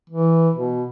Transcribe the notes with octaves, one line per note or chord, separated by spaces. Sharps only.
E3
B2